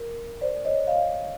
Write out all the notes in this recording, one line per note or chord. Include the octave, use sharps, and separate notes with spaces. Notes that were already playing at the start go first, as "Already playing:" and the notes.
Already playing: A#4
C5 D5
C#5 D#5
D#5 F5